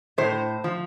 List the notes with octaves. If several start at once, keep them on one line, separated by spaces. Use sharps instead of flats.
A2 C5
F3